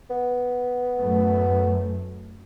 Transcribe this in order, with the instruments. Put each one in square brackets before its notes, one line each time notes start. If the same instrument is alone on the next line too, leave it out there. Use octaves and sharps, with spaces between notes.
[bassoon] B3
[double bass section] F#2 A2 A3